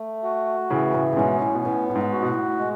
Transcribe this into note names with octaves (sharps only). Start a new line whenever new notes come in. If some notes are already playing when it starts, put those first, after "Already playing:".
Already playing: A3
F#4
A2 C#3 E3
A2 C#3
A2
G#2 B2 C#4
A2
B2
A2 B3
A2
G#2
F#4
B2
A2
G#3